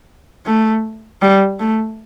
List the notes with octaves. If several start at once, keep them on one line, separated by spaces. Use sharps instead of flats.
A3
G3
A3